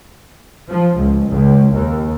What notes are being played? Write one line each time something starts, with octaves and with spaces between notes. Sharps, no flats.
F3
C#2
C#2
D#2